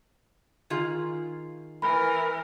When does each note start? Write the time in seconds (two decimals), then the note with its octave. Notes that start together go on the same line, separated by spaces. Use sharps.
0.70 D#3 F4 G#4
1.82 E3 A#4 B5